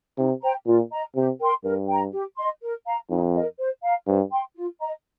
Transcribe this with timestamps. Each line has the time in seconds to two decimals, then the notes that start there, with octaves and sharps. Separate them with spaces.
0.18 C3 D#4
0.42 C5 G5 A#5
0.66 A#2 F4
0.91 D#5 A#5
1.15 C3 G4
1.40 A#4 G5 C6
1.64 G2 A#4
1.88 G5 A#5
2.12 G4
2.36 D#5 C6
2.62 A#4
2.86 F5 A#5
3.10 F2 D#4
3.34 A#4 D#5
3.58 C5
3.84 F5 A#5
4.07 G2 C5
4.32 G5 C6
4.56 F4
4.80 D#5 A#5